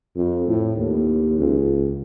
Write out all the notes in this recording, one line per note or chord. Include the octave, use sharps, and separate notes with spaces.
F2
A2
D#2
C#2